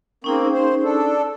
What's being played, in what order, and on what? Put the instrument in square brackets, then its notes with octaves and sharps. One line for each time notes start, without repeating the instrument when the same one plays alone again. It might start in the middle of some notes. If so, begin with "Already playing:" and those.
[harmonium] A#3 C4 [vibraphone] C#4 D#4 G#4
[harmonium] C5
D4 A4